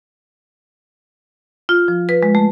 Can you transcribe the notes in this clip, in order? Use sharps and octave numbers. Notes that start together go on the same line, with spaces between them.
F4
F3
B4
G#3
A3